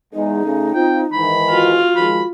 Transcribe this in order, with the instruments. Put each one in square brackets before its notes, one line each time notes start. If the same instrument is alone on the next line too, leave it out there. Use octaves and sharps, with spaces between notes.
[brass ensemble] E2 G#3 [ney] D#4
[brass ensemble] C#3 A3
[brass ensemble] C4 F4 [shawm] G5
[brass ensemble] G#2 D#3 E3 [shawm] B5
[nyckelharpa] F4 [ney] F#4
[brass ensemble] D#3 F3 G#3 [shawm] B5